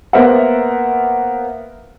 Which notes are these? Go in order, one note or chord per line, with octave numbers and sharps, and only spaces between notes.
A#3 B3 A#4 C5 E5 F#5